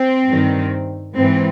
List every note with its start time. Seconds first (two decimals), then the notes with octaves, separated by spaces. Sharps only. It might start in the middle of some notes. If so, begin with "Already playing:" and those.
Already playing: C4
0.28 G2 D#3
1.15 G#2 E3 C4